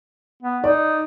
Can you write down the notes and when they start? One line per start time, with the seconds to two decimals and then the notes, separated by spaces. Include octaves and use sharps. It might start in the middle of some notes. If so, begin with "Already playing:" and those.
0.43 B3
0.64 D#4 D5